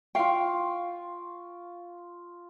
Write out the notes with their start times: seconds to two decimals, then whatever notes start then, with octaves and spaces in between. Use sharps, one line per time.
0.15 F4 F5 G5 C#6